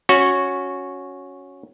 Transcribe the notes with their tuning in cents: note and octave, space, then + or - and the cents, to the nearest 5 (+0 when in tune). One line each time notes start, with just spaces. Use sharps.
C#4 +0 F#4 -10